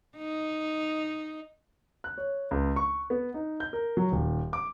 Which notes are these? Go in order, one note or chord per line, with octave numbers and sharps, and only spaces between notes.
D#4
F#6
C#5
C#2
C#6
B3
D#4
G6
A#4
F#3
D#1
D6